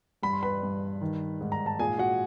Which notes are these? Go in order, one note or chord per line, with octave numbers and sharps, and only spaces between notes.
G2 B5
C6
B4 B5
G2
D#3
G#2
A#5
A5
A#2 G#4 G#5
F#4 F#5